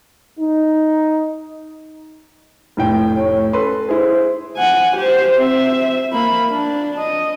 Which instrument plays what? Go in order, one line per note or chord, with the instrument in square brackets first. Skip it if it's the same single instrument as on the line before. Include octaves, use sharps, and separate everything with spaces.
[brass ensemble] D#4
[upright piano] F1 A2 G5
[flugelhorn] C#5
[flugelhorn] C#4 [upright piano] A4 B4 C6
[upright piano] E4 G#4 [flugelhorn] C5
[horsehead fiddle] F#5 G#5
G4 C5
C4 E5
A#3 B5
D4
D#5